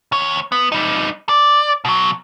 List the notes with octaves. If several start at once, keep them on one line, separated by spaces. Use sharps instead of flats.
D#2 C#5
B3
G3 D#4
D5
B2 F#3